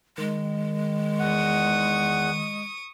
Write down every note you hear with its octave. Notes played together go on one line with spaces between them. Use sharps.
D#3 G#3
E2 F#5 C#6 D#6